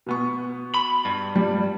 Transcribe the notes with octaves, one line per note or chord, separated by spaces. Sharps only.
B2 B3 C#6
B5
G2
G3